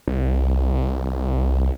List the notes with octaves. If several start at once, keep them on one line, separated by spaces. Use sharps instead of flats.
C2
C2